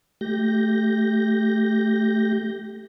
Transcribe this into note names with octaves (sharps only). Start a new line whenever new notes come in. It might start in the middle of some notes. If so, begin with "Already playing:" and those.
A3 G4 G6 A#6